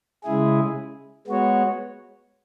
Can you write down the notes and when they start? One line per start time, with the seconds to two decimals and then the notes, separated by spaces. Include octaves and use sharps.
0.24 C#3 G#3 E4 G#4
1.27 G#3 B3 F#4 C#5